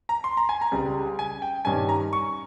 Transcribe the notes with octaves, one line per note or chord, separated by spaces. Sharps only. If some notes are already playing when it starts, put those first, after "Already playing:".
A#5
C6
A#5
G#5
A#5
C#2 C#3 G3
G#5
G5
G2 D#3 G3 C#4 G#5
A#5
C#6